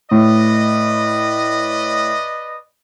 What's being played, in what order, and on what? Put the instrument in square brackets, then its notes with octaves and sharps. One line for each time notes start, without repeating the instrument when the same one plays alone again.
[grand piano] A2 [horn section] B4 D5 D#5